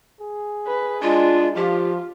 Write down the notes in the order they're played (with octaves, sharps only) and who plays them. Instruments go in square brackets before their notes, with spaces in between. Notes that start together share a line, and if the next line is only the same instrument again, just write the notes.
[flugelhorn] G#4
[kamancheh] B4
[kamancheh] G#3 D4 [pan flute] F4
[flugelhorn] F3 [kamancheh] F4 [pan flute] G4